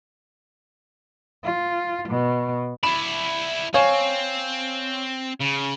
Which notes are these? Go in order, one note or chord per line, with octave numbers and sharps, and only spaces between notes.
F4
B2
E4 D5 B5 E7
C4 C#5 F5 G#5
C#3